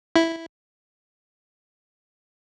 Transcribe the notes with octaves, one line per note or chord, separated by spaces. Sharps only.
E4